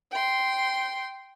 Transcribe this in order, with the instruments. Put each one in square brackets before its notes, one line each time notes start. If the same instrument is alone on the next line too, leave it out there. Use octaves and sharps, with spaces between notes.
[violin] G5 C6